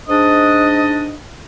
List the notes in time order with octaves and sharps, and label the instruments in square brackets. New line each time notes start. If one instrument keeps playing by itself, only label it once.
[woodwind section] G#2 D4 D#5